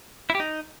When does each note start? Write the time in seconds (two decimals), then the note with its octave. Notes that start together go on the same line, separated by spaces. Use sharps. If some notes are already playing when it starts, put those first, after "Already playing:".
0.30 E4
0.35 G4
0.40 D#4